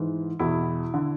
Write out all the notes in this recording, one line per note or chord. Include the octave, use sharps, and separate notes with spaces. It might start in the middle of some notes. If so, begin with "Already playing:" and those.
Already playing: G#2 E3
E2 B2 E4
D3